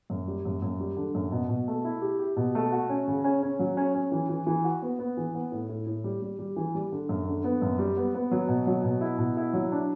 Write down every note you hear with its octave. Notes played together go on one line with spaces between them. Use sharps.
F#2
G3
F#2
F#2
G3
D3
F#2
B2
B2
A3
E4
G4
G4
B2
A3
F#4
C#4
C#3
C#4
C#4
F#3
C#4
C#4
E3
E3
E3
F#4
B3
B3
E3
B3
A2
A2
A2
G3
G3
G3
E3
G3
D3
F#2
D3
B3
F#2
G3
B3
B3
F#3
B2
F#3
B2
E4
B2
E4
F#3
D4